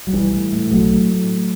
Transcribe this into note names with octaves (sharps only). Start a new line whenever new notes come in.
F#3
B1 E3 G3
A2
A2
B1 F#3 A3
A2
A2